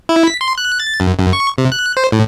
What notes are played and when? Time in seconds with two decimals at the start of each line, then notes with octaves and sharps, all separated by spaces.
0.09 E4
0.27 B6
0.41 C6
0.58 F#6
0.80 A6
1.00 F#2
1.19 F#2
1.33 C#6
1.58 C3
1.72 F#6
1.97 C5
2.12 A2